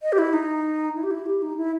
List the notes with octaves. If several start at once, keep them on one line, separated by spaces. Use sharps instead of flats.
D#5
G4
E4
D#4
E4
G4
E4
G4
D#4
E4